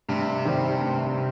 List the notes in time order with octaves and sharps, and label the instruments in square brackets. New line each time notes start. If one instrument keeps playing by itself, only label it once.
[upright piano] G2 [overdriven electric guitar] C3
[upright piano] D#3 G3 C4
G2